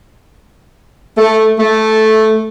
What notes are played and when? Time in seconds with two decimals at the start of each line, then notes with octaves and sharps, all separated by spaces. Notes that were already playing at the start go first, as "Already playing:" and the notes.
1.17 A3
1.58 A3